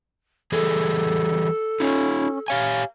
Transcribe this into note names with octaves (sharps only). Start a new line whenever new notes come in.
E3 G3 G#4 A4
C#4 D#4 F4
G4 C#5 F5 G#5